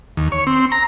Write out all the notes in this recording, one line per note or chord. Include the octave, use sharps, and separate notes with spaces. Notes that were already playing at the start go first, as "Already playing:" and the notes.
D#2
C#5
C4
A#5